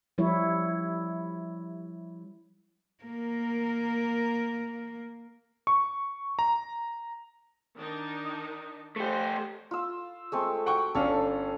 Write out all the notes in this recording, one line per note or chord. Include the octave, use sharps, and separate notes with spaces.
F3 G3 E4 C#5
A#3 A#4
C#6
A#5
D#3 D4 D#4
A3 G4 C5
F4 E6
G#3 A3 C4
F#4 F#5 G5 C#6
G1 C#4 D4 A4 F5